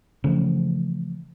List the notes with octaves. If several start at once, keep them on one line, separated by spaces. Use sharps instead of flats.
C#3 E3 F3 A3